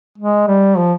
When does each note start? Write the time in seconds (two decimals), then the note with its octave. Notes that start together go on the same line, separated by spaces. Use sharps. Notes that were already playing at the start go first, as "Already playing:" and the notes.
0.18 G#3
0.47 G3
0.77 F3